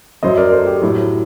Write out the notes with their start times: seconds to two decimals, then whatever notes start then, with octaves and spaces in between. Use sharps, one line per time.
0.23 F#2 F#3 C5 D#5
0.37 A#4 D5
0.52 A4 C5
0.66 G4
0.82 A2 F#3